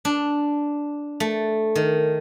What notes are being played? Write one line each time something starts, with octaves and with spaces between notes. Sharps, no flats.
D4
A3
D#3